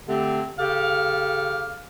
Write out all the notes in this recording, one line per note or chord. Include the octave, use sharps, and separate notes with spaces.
D3 A3 C4 G4
C#3 G4 A4 F5